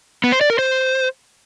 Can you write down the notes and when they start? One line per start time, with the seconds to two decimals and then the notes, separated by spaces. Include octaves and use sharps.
0.24 B3
0.32 C5
0.41 D5
0.50 A#4
0.59 C5